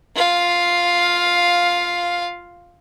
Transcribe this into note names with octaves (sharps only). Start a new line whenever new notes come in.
F4 F5